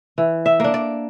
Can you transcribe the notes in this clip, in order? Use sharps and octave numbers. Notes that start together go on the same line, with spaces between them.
E3
E5
A#3 D4
D5